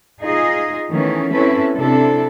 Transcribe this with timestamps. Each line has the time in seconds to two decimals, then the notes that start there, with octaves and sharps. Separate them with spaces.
0.21 D#4 F4 G#4 D#5
0.90 D#3 E3 A3 B3 C#4
1.33 C4 C#4 E4 A4 B4
1.76 C3 D4 E4 A4